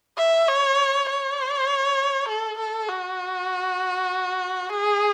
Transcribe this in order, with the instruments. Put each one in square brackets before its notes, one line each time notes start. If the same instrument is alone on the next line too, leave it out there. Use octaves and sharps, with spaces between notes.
[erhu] E5
C#5
C#5
A4
A4
F#4
G#4